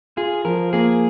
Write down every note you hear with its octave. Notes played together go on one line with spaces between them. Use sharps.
F4 G#4
F3 A#4
A#3 G#4